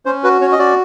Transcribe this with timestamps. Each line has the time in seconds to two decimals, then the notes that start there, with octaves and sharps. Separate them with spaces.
0.06 C#4 C5
0.24 F#4 B4
0.41 C#4 C#5
0.52 D#5
0.59 F#4 D5